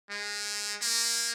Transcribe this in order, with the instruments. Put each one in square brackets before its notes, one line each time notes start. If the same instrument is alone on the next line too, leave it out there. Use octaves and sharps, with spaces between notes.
[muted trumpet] G#3
A#3